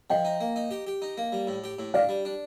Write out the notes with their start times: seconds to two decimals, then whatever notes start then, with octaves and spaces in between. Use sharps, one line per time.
0.10 F3 D#5 G5
0.25 D#4
0.41 A#3
0.56 D#4
0.71 G4
0.87 G4
1.02 D#4
1.18 A#3
1.32 G3
1.47 A2
1.64 G4
1.79 A2
1.94 D4 D5 F5
2.09 G3
2.25 D4